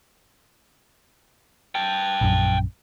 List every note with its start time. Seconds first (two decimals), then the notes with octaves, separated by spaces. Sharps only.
1.75 G5 A5
2.21 A#1 F#2